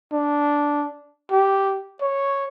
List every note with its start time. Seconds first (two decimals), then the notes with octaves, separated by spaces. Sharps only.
0.13 D4
1.31 G4
2.01 C#5